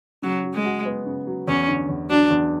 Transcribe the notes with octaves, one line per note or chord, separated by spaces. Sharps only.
C#3 F#3
F#3
G#3
F#4
B3
C#3
F#3
E2 C#4
D3
E2
F#3 D4
E2